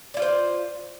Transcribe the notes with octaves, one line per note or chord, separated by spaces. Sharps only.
E4 F4 C5 D5